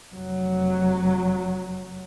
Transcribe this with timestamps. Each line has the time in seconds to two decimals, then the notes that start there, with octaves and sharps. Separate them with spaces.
0.12 F1 F#3